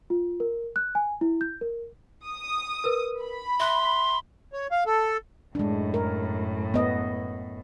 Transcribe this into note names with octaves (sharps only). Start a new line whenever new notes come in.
F4
A#4
F#6
G#5
E4
G6
A#4
D#6
A#4 B4
B5
E5 C6 F#6
C#5
F5
A4
F#2 A2 G#3 D4
A#4
B3 D#5